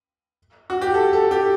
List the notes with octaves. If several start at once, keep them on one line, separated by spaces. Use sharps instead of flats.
F#4
G4
A4
A4
G4